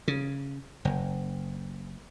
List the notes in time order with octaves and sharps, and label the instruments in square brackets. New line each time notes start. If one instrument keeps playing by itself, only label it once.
[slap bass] C#3
F#1